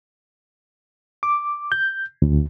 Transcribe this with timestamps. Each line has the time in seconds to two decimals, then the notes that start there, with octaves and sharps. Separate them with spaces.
1.23 D6
1.72 G6
2.22 D2